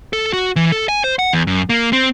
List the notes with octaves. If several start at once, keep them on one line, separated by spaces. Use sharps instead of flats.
A4
F#4
E3
A4
G#5
C5
F#5
E2
F#2
A#3
C4